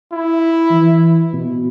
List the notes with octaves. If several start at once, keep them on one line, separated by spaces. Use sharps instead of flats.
E4
E3
B2